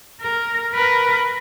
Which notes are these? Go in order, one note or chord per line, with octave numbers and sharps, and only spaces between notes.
A#4
A#4 B4